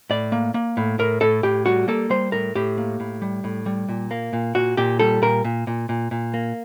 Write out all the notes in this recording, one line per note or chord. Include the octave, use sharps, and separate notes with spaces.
A2 D5
A#3
A#3
A2
A2 A#4
A2 A4
A2 G4
G3 F#4
A#3 A4
G3 C5
A2 A#4
A2 G4
A#3
A2
G3
A2
G3
A#2
A#3
A#2
A#2 F#4
A#2 G4
G3 A4
A#2 A#4
A#2
A#2
A#2
A#2
A#3